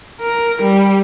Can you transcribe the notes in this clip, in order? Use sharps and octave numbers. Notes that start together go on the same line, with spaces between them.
A#4
G3